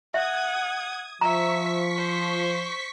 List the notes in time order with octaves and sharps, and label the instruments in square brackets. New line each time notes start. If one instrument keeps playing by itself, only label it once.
[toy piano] E5 [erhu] F#5 [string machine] D#6 G#6
[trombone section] F3 [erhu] E5 [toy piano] A#5 [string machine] C#6 B6
[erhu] C5